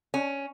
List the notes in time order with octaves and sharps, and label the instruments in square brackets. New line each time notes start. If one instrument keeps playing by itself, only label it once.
[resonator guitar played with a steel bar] C#4